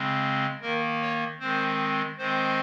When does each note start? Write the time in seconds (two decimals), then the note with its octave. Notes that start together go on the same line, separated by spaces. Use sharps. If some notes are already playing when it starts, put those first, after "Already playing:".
Already playing: C#3 G#3 C4
0.62 D#3 A#3 A#4
1.01 C#5
1.39 D#3 G#3 C4 C5
2.18 D#3 G#3 C4 C5